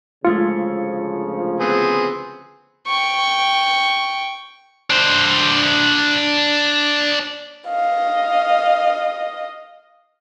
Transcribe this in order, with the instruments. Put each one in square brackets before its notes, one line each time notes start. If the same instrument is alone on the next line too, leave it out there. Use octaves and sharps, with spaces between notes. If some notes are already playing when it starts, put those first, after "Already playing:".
[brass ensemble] D2 C#3 F3 [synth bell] G#3 A3 C#7 [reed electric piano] F4
[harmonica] B3 C4 G#4
[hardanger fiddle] G5 C#6
[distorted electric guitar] D4 C5
[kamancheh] D#5 F5